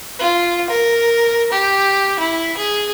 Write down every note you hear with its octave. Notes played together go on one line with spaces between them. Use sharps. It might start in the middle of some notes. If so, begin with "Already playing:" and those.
F4
A#4
G4
E4
G#4